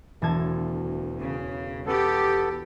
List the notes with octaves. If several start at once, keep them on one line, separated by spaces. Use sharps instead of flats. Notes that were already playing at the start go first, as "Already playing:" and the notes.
E1 D2 A5 G#6
C#3
B3 G4 A4